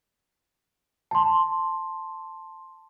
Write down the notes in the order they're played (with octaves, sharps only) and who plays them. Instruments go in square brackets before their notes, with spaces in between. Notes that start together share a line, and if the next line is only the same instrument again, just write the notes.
[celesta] A5 C6